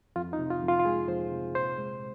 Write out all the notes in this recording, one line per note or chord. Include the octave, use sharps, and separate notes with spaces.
F2 F4
D#4
C3
F4
F2
F4
F4
G#3 G#4
F2 C5
C3
A#2 C5
G#3